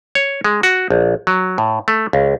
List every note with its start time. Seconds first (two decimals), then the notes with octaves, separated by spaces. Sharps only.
0.15 C#5
0.44 G#3
0.63 F#4
0.90 A#1
1.27 F#3
1.58 A2
1.88 A3
2.13 C#2